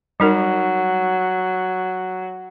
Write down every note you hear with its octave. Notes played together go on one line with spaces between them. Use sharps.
F#3 G3 D#4 A#4